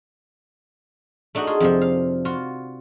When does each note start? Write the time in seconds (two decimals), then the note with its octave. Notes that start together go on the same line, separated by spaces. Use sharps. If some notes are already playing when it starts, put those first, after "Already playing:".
1.35 A3 D4 D#4 F#4
1.47 F4 G#4
1.60 F2 C3 F3
1.81 F5
2.25 F4 F#4